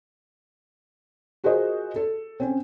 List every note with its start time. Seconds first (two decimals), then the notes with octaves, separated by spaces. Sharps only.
1.44 F4 F#4 G#4 A#4 C5 D#5
1.96 A4
2.40 C4 C#4